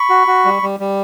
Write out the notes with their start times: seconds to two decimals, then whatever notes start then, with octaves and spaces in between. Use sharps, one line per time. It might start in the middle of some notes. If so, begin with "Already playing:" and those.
Already playing: B5 C#6
0.10 F#4
0.27 F#4
0.45 G3
0.62 G3
0.80 G3